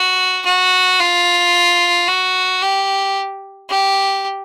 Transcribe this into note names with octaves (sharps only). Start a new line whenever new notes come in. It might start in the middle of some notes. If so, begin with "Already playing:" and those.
Already playing: F#4
F#4
F4
F#4
G4
G4